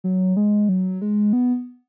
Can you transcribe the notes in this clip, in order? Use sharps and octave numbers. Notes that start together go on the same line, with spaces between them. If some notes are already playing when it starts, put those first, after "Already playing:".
F#3
G#3
F#3
G#3
B3